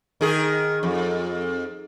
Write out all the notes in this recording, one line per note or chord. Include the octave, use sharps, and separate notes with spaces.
D#3 G#4
F2